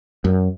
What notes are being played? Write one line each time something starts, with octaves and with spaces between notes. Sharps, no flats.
F#2